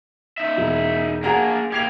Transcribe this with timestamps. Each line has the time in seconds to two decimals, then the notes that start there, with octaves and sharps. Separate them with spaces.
0.38 D#4 E5
0.58 E1
1.24 A#3 D4 G#4 F#5 A#5
1.72 A#3 G4 G#6 C7 F7